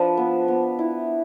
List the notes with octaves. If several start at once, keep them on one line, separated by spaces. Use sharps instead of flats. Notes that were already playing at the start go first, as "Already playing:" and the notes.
Already playing: F3 D4 F4 B4
B3
B3
E4